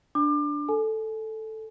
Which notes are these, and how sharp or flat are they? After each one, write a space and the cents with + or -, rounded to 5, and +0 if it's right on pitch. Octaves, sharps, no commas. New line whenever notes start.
D4 +0 D6 +30
A4 +0 G#5 +30